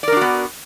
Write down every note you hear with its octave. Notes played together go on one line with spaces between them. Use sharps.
B3 D4 F#4 A#4 D5